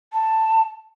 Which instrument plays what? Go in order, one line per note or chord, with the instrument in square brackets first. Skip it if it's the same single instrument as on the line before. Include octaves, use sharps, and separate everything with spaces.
[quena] A5